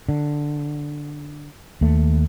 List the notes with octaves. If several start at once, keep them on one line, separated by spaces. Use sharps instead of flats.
D3
D#2 A3